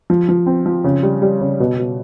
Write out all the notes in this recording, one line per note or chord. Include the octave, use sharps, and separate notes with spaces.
F3
F3
C4
F3
C#3
G3
G3
C#3
B2
B2